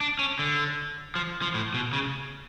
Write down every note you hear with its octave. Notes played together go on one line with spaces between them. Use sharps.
D4
C#4
D3
F3
F3
A2
B2
C#3